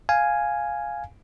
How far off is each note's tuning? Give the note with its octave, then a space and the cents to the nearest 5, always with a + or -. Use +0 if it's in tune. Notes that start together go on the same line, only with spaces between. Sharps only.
F5 +0 G#5 +0